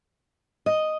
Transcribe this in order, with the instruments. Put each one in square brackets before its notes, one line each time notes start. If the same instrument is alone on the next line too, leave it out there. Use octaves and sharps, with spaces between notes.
[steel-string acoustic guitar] D#5